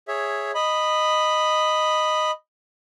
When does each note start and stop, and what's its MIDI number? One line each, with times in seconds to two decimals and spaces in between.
0.08 0.51 68
0.08 0.51 73
0.08 0.51 76
0.55 2.31 75
0.55 2.31 83